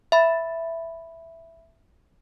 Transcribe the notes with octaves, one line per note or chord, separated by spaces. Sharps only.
E5 B5